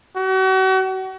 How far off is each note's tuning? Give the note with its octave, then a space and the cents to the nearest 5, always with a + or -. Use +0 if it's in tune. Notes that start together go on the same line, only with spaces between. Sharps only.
F#4 +40